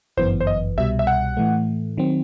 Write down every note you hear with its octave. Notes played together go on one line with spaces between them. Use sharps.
G1 F#2 E3 B3 C5
C5
D#5
C2 B2 G3 E5
E5
F#5
A2 E3 A3
D#3 F#3 C4